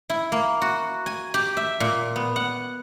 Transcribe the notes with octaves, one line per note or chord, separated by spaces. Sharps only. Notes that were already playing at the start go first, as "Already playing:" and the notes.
E4
A#3
F#4
G#5
G4
E5
A#2
B3
F#5